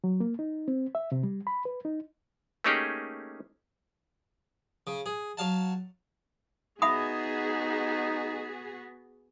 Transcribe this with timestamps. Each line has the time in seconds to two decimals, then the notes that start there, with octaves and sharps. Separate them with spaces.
0.04 F#3
0.20 A#3
0.39 D#4
0.68 C4
0.95 E5
1.12 C3
1.23 G3
1.47 B5
1.65 B4
1.85 D#4
2.64 A3 A#3 C#4 D#4 G4 G#4
4.87 C#3
5.06 G#4
5.37 F#3 F5 A5
6.82 B3 D#4 F#4 G#4 E5 B5 D#6